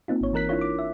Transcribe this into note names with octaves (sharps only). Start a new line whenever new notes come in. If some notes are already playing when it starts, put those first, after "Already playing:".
A#3 C4 D#4 F4
G#1 C#5
E3 D#4 A#4 F#6 B6
D4 E4 F4 C#5
D6
E5